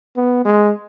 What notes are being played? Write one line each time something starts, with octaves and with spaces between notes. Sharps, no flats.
B3
G#3